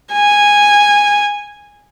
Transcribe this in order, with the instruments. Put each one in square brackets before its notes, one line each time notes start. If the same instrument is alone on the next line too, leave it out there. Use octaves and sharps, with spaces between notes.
[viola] G#5